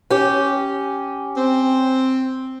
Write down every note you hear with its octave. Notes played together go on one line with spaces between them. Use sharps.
C#4 G4
C4